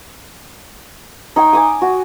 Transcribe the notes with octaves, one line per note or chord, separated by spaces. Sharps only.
D#4 C#5 G5
G#5 D6 D#6
F#4